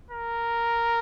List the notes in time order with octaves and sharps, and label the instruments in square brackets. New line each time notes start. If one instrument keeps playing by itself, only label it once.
[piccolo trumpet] A#4